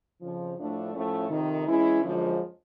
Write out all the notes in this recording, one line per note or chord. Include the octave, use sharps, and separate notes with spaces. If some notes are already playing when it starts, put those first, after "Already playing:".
F2 C#3 F3
A2 F3 A3 D4
A2 F3 A3 C#4
F2 C3 D#3
E3 G#3 C#4 E4
F#2 D3 F3 G#3